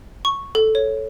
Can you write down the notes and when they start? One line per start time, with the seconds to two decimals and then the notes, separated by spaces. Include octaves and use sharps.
0.25 C#6
0.55 A4
0.75 C#5